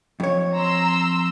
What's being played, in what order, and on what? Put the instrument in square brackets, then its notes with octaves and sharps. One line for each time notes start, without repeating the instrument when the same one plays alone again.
[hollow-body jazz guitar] F2 C#5
[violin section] A#5 C6 E6